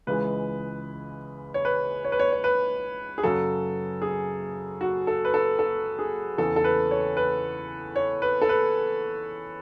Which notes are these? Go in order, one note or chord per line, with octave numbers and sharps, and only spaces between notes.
C#2 C#3 E3 G#3 B4
C#5
B4
C#5
B4
C#5
C#5
B4
G#4
F#2 C#3 F#3 A4
G#4
F#4
A4
B4
A4
A4
G#4
E2 C#3 E3 A4
A4
B4
C#5
B4
C#5
B4
A4
B4